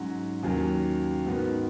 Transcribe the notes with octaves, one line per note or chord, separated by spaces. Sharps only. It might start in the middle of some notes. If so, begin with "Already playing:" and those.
Already playing: G#2 F#3 C#4 F#4
D#2 D#3 F#3 C#4
G#2 D#3 B3 F#4